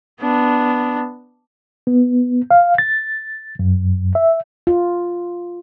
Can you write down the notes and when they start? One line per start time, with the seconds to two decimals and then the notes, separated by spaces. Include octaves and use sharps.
0.21 B3 D4
1.87 B3
2.51 F5
2.78 A6
3.59 F#2
4.15 E5
4.67 F4